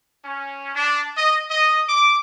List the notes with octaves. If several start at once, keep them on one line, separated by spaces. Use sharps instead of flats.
C#4
D4
D#5
D#5
D6